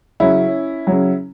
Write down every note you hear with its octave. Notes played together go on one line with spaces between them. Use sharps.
C#3 F#3 C#4 E4
C#3 F#3